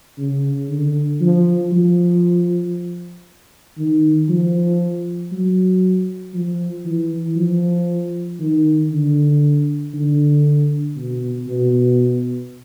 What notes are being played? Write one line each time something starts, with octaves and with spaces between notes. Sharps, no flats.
C#3
D3
F3
F3
D#3
F3
F#3
F3
E3
F3
D#3
D3
D3
B2
B2